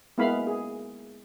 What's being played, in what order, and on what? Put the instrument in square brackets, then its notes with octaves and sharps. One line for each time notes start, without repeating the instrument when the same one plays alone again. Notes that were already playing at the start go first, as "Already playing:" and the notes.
[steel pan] G#3 A#3 B3 E4 F5 B5
G#4